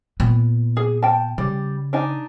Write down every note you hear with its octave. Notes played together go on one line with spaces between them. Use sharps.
A#2 B3
G#4
G5 A5
C#3 G3
D4 D#4 G#5